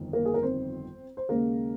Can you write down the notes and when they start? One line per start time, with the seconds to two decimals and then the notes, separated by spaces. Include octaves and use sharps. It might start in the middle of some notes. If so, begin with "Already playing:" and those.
Already playing: G1 F2 D#3
0.13 A#3 A#4
0.25 G#4
0.34 A#4
0.43 C4 C5
1.17 C5
1.29 D#2 C#3 G#3 A#3 A#4